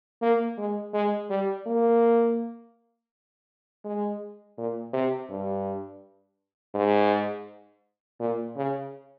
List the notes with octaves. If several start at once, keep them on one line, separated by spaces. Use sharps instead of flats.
A#3
G#3
G#3
G3
A#3
G#3
A#2
C3
G2
G#2
A#2
C#3